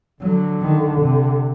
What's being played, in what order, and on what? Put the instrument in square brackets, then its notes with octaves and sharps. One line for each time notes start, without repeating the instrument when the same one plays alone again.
[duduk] D3 [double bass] F#3
[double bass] D#3
C3